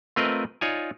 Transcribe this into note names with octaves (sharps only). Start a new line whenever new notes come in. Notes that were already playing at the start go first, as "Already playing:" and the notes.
A3 C4 F4 A#4 B4 D#5
D#4 F4 C#5 D5 G#5